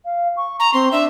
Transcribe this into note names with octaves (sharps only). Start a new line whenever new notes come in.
F5
C#6
A#5 C#6
C4 C6
D4 E5